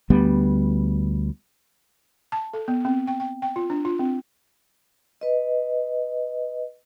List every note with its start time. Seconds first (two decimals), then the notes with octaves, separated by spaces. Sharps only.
0.10 D2 G3 B3
2.32 A5
2.54 A4
2.68 B3
2.85 C4
3.07 G5
3.20 G5
3.42 G5
3.56 F4
3.70 D4
3.85 F4
3.99 C4
5.21 B4 D#5